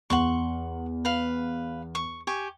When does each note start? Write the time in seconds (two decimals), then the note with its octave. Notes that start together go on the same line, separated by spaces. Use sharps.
0.10 E2 F#5 C6 C#6
1.05 B4 F5
1.95 C#6
2.27 G4 G#5 C#6